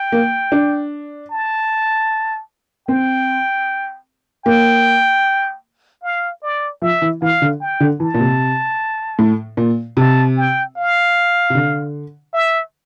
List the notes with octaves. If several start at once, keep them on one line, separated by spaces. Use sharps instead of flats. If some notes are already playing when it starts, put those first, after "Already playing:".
Already playing: G5
A#3
D4
A5
C4 G5
A#3 G5
F5
D5
F3 E5
E3
E3 F5
D3
G5
D3
E3 A5
A#2
C3
A2
A#2
C3 A5
G5
F5
C3
D3
E5